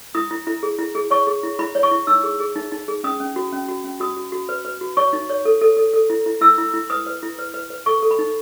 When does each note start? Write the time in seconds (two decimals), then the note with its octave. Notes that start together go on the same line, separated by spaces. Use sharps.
0.15 E4 D#6
0.31 E4
0.47 E4
0.63 G#4
0.79 E4
0.95 G#4
1.11 C#5 C#6
1.27 G#4
1.43 E4
1.59 E4 B5
1.75 C#5
1.83 C#6
1.91 E4
2.07 D#4 E6
2.23 G#4
2.40 G#4
2.56 D#4
2.72 D#4
2.88 G#4
3.04 C#4 D#6
3.20 C#4
3.36 F#4
3.52 C#4
3.69 F#4
3.84 C#4
4.00 F#4 D#6
4.16 F#4
4.32 F#4
4.49 B4
4.65 B4
4.81 F#4
4.97 C#5 C#6
5.13 D#4
5.29 C#5
5.45 A4
5.61 A4
5.77 A4
5.93 A4
6.10 E4
6.26 E4
6.41 E4 E6
6.58 E4
6.74 E4
6.90 B4 D#6
7.06 B4
7.23 E4
7.39 B4
7.54 B4
7.70 B4
7.86 A4 C#6
8.02 A4
8.11 B5
8.19 D#4